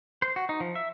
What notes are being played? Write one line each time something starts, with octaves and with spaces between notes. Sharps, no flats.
C5
F#4
D#4
F3
E5